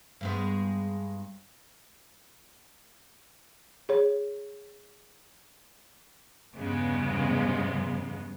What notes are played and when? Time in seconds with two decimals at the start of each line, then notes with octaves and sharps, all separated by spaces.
0.21 G2 G#3 B3
3.89 G#4 C#5
6.56 E2 G2 C#3 G#3 B3